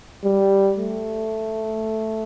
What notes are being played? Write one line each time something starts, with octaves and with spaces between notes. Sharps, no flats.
G3
A3